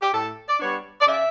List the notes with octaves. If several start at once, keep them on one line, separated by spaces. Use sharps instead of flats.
G4
A2 A4
D5
G3 B3 D4 C#5
D5
C#3 E5